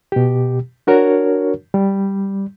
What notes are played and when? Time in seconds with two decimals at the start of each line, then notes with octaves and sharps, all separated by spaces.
0.12 B2 G4
0.87 D4 F#4 A#4 C#5
1.74 G3